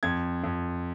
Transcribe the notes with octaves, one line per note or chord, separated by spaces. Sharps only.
F2 G#6
F2